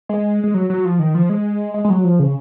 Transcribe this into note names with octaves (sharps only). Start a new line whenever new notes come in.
G#3
G#3
F#3
F#3
F3
D#3
F3
G#3
G#3
G#3
F#3
F3
C#3